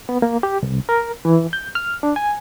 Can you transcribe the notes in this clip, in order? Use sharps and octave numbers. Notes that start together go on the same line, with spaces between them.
B3
A#3
G4
C2
A#4
E3
G6
F6
D4
G#5